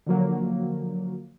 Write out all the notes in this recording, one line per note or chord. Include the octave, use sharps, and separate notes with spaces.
D3 F3 F#3 A#3